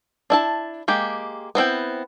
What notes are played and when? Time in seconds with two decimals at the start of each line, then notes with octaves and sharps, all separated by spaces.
0.30 D4 E4 A5
0.88 G#3 A#3 G4
1.55 B3 C4 E4 G5